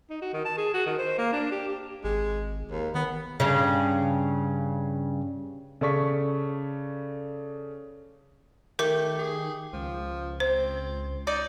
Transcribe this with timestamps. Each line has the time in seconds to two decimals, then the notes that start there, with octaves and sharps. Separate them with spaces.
0.10 D#4
0.22 F#4
0.33 D#3
0.45 A5
0.57 G#4
0.74 F#4
0.86 D#3
0.98 C5
1.18 A#3
1.33 D4
1.52 G4
1.67 G4
2.04 G#1 G#3
2.71 D#2
2.95 D#3 B3
3.40 G2 C#3
5.81 C#3 A4 D5 C#6 B6
8.79 D#3 A3 G4 A#4
9.18 G#4
9.73 C#2 F3
10.40 C4 C5
11.27 D#4 D5